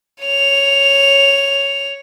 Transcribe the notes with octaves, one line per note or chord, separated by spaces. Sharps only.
C#5 F7